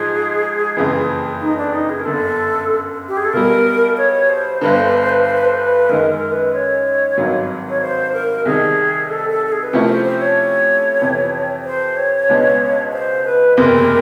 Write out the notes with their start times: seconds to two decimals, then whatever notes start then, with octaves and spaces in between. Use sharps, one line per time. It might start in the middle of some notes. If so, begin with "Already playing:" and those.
Already playing: G#2 F3 G#4
0.77 F#1 F2 C#3 E3
1.41 D#4
1.57 D4
1.73 D#4
1.90 G#4
2.00 A#4
2.05 G1 F#2 D3 A4
3.08 G4
3.17 G#4
3.25 A4
3.33 B1 B2 G3 A#4
3.98 C#5
4.29 C5
4.61 G1 G2 D3 B4
4.73 C5
4.85 B4
4.97 C5
5.09 B4
5.22 C5
5.34 B4
5.45 C5
5.58 B4
5.89 F#2 D#3 G#3 A#4
6.11 A#4
6.32 B4
6.53 C#5
7.17 G#1 G2 D#3 F#3
7.70 C#5
7.81 C5
8.13 A#4
8.45 C2 C3 D#3 G#4
9.09 A4
9.30 A4
9.46 A4
9.52 G#4
9.63 B4
9.73 C3 F3 A3 C#4 E4 A#4
9.89 C5
10.05 C5
10.21 C#5
11.01 F2 C3 E3
11.65 C5
11.97 C#5
12.29 C#2 B2 G#3 B3 D4
12.93 C5
13.25 B4
13.57 F#1 E2 C3 A#4